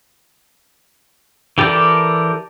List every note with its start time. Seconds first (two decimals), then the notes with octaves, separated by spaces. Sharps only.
1.58 E3 G4 A4 A#4 D5